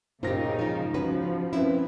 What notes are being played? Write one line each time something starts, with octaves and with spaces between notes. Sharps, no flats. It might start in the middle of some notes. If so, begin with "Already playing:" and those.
A#2 C#3 D#4 F4 G4 C5 A#6
G#2 F3 F4
F3 C#4 F#4 B4
C4 C#4 E4 B4